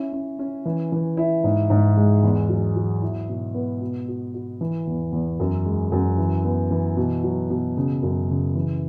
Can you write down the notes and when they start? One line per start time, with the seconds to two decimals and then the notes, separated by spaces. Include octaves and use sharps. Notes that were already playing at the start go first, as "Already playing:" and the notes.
Already playing: C#4 E4
0.13 C#4
0.39 C#4
0.65 E3
0.92 E3
1.17 E4
1.44 G#2
1.70 G#2
1.97 G#3
2.23 E2
2.49 F#3
2.76 F#3
3.02 E4
3.29 B2
3.54 B3
3.81 B2
4.08 F#4
4.34 F#4
4.61 E3
4.87 E2
5.12 E2
5.40 F#2
5.66 G#3
5.92 F#2
6.18 E3
6.44 B3
6.71 E3
6.97 B2
7.24 F#3
7.50 B2
7.77 C#3
8.03 F#2
8.30 C#3
8.55 E3